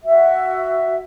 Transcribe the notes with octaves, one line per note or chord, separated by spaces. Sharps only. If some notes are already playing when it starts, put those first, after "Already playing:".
F#4 E5